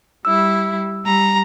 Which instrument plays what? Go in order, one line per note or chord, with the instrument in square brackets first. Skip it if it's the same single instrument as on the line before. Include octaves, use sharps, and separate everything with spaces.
[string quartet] G3 E4 [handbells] E6
[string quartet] G3 [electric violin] A#5